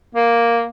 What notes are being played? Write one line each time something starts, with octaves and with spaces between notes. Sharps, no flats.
A#3